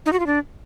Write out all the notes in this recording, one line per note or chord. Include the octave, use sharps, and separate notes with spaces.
D#4
F#4
F4
D4